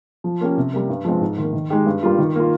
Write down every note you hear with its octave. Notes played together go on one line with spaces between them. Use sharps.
F3
A#3 C#4 G4
C3
G3 A#3
G2
F3 G#3 C4
G#2
D#3 A#3
D#3
G#3 D#4 G4
G2
G3 A#3 F4
D#3
A#3 F4